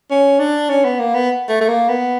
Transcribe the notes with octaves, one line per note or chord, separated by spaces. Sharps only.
C#4
D4
C#4
B3
A#3
B3
A3
A3
A#3
B3